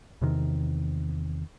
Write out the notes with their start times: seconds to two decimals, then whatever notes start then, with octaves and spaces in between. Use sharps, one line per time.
0.21 E2 C3 D#3